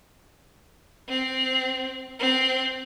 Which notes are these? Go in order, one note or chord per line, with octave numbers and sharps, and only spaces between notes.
C4
C4